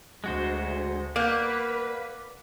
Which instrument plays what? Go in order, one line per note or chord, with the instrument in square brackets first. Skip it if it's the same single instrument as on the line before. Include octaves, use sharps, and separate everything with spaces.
[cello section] D2 [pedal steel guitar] G#3 F#4 C5
[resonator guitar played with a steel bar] A#3 [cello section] B4 [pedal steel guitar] D5 F#5 G6